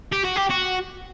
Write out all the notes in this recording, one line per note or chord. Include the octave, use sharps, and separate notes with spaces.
G4
F#4
G4
F#4